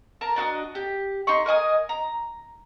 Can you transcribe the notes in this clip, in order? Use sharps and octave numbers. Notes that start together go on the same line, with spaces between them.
A#4 A5 A#5
D4 F#4 A4 D#5
G4
D#4 C6 C#6
A#4 D#5 G#5 D#6
A#5